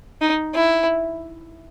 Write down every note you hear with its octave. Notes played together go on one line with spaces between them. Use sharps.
D#4
E4